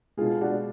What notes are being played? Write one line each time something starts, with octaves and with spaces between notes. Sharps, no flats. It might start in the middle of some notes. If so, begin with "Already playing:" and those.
B2 G#3 F4 G#4
D4 F#4